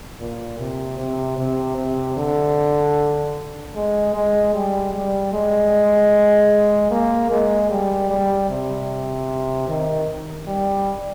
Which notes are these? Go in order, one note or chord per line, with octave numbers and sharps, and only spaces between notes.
A#2
C3
C3
C3
C3
D3
G#3
G#3
G3
G3
G#3
A#3
G#3
G3
G3
C3
D#3
G3